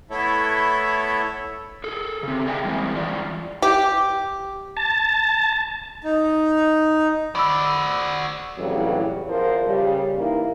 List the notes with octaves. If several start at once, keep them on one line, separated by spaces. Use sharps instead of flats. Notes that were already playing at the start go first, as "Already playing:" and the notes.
A3 B3 E4 A4 C#5 E5
G#4 A4
C#3 C4
G#4 A#4 D5 E5 G5 G#5
E3 G3 G#3 A#3 C4
G2 E3 F4 D5
G4
A5
D#4
F#4 D5 B5 C#6 E6
F2 A2 C#3 E3 F#3 G3
E2 F3 A#4 C5
C#3 G3
E3 A#3 D#4 E4